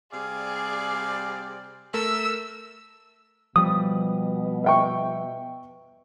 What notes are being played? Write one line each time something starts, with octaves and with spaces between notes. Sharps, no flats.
C3 G3 G#4 D5 F5
A3 A4 A#4 E5 E6
B2 F3 G3 D#6
E5 G5 C#6